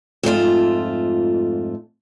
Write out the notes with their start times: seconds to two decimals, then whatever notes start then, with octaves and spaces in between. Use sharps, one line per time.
0.23 F2 G#2 A3 F4